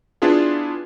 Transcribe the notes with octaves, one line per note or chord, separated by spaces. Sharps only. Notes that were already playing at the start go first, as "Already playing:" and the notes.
B3 D4 E4 F4 G#4